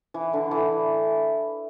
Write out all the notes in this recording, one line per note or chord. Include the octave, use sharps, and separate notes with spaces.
E3
D3
E3